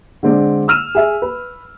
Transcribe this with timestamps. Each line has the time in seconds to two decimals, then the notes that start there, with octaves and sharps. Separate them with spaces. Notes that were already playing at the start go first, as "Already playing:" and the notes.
0.23 D3 G#3 C4 D5
0.68 E6 F6 D#7 E7
0.95 G#4 E5
1.22 B4